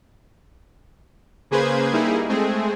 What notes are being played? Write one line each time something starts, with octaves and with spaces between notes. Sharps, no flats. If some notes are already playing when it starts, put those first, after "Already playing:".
C#3 A#3 G#4 B4 C5 G#6
G3 A#3 D#4 E4 G#4
G#3 A3 C4 G#4